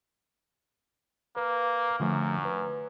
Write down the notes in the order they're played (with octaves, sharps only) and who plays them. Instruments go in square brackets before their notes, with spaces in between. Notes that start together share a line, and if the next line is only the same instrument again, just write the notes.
[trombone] A#3 [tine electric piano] B4
[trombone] F#2 [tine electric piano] D3 F3 A3
[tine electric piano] B4